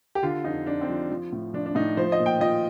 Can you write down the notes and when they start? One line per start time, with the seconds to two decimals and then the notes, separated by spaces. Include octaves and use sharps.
0.15 G4
0.23 D3 F4
0.44 F2 D#4
0.67 F2 D4
0.81 C4
0.89 F3
1.11 F3
1.32 A2
1.54 F3 D4
1.66 D4
1.75 A2 D#4
1.97 F3 C5
2.12 D#5
2.19 A#2
2.26 G5
2.41 F3 D#5